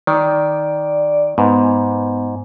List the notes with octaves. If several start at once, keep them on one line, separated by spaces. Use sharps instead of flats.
D#3 D5
G#2 B3